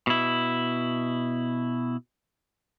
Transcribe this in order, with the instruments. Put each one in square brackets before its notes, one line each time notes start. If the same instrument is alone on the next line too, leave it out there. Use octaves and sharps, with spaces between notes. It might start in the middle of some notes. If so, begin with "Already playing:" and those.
[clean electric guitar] B2 E4